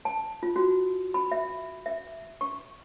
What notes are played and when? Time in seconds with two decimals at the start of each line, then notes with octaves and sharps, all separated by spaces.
0.05 A5
0.43 F4
0.56 F#4
1.14 B5
1.32 E5
1.86 E5
2.41 C#6